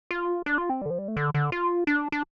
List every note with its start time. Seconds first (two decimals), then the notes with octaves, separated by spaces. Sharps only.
0.11 F4
0.46 D4
0.58 F4
0.70 C4
0.82 G3
0.86 D3
0.90 F3
0.99 G3
1.08 A3
1.17 D3
1.34 D3
1.52 F4
1.87 D4
2.12 D4